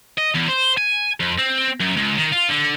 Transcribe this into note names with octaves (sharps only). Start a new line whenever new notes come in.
D#5
E2
C5
G#5
F2
C4
F#2
C#2
D#3
F4
D3